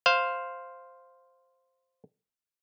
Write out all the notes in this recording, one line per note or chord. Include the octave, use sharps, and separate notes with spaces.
C5 F5